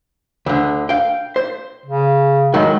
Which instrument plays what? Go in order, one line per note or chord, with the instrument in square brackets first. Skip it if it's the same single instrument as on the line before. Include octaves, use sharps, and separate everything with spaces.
[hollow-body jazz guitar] D2 D3
F5 G5
C5
[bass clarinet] C#3
[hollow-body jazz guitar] A2 D#3 F#3 [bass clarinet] G#3